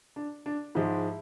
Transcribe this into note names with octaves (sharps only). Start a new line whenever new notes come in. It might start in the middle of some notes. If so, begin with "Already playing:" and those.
D4
D4
G#2 F3 G#3 E4